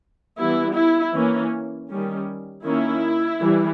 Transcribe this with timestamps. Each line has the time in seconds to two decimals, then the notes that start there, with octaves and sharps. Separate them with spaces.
0.38 E3 G3 B3 E4
0.76 E4
1.14 E3 A#3 C#4
1.89 D#3 G3 C#4
2.65 D#3 A#3 C#4 E4
3.41 E3 G3